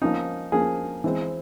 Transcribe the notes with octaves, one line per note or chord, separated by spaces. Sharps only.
F3 A#3 C#4 D#4
F3 A#3 C#4 G#4
E3 G#3 C4